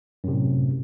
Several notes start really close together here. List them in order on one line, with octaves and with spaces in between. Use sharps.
F#2 C3 A2